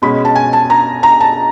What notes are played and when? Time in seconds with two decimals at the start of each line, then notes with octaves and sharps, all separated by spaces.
0.02 B2 G#3 C#4 B5
0.25 A5
0.35 G#5
0.53 A5
0.70 A#5
1.03 A#5
1.21 A5